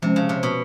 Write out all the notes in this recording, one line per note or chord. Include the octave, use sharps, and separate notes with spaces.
C3 F3 G#3 C#4
C#3
C3
B2